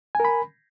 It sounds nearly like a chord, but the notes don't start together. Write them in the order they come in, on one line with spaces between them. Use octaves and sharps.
G#5 A#4 B5